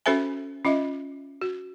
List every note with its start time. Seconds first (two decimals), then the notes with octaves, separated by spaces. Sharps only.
0.06 C#4 F#4 A4 C5 E5 G#5
0.65 C#4 F4 D#5 E5
1.42 F#4